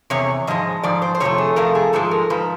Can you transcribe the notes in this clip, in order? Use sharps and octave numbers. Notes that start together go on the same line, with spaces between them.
E2 C3 C#5
G#2 F3 G#3 D#5
G#2 F3 D5
C5
C5
F2 C3 F3 A3 C#5
G#4
F2 C3 F3 A3 A#4
G#4
G#2 F3 G#3 A4
A#4
G#2 F3 B4